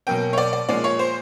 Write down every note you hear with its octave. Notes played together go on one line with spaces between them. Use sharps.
B2 F#3 A#3 C#4 G5
C#5
D5
D5
A#2 F3 G#3 C#4 D5
C#5
C5